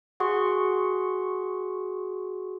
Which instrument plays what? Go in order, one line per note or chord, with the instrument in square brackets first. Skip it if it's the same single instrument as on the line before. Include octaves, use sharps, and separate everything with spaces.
[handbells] F#4 G#4 F#5 C6 C#6